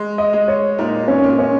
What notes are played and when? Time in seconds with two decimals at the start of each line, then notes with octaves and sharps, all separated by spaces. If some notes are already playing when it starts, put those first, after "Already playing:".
Already playing: G#3
0.18 D#5
0.33 G#3
0.48 C#5
0.78 A#2 D#4
1.08 C#4
1.24 A#2
1.39 C#4